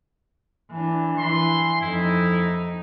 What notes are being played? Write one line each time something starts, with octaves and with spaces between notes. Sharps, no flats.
E3 D4
E3 C6
F2 D#4 E4